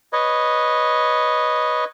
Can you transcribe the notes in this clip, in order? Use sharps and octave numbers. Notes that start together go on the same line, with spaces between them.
B4 C#5 D#5